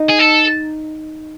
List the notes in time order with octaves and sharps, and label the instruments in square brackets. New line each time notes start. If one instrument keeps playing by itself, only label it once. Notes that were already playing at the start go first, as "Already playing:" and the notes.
Already playing: [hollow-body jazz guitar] D#4
[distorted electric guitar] G#4
A4